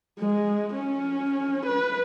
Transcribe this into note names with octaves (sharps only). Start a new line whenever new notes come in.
G#3
C#4
B4